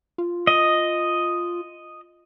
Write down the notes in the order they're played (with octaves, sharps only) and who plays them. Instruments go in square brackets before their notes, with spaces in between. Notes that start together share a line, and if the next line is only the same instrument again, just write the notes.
[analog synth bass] F4
[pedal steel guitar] D#5